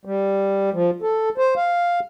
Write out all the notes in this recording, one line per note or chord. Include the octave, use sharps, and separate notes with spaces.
G3
F3
A4
C5
F5